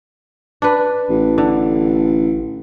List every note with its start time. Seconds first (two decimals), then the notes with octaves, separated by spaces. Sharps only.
0.62 D4 B4
1.09 A1
1.38 D3